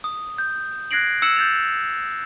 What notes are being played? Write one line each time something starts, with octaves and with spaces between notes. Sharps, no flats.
D#6
G6
F#6 G#6 A#6 C7 D7 F#7
E6 C#7 E7 F#7
G6 A6 F7